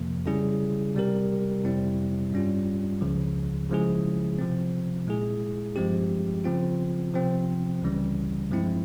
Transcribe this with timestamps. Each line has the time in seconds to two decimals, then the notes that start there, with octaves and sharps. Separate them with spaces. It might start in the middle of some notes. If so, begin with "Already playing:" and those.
Already playing: F2 C3 F3 A#3
0.26 C#3 G3 C#4 E4 G#4
0.94 C3 G3 C4 G4 A#4
1.64 F2 C3 G3 C4 E4
2.33 G2 G3 C#4 F4
3.01 C#2 C#3 F3
3.69 C#3 F3 G#3 E4 G#4
4.39 C3 F3 C4
5.07 A#2 G#3 E4 G#4
5.76 G2 F3 G#3 C4 G4
6.44 C#3 F3 C4 F4
7.13 C3 F3 C4
7.82 C#2 C#3 E3 G3 C#4
8.51 G2 F3 G#3 C4 E4